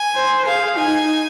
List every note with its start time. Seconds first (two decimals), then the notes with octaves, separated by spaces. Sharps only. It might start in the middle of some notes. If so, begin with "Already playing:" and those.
Already playing: G#5
0.15 C5
0.46 G#4 F5
0.77 D#4 G#5